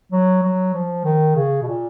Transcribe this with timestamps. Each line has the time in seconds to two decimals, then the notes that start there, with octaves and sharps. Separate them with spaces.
0.12 F#3
0.42 F#3
0.74 F3
1.05 D#3
1.35 C#3
1.62 B2
1.67 A#2